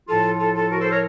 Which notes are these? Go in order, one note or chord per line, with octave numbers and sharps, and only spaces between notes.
A2 F3 F4 A4
F4 A4
F4 A4
F#4 A#4
A4 C5
A#4 C#5